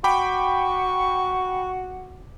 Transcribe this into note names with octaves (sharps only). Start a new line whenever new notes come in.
F#4 G5 B5 C#6 D6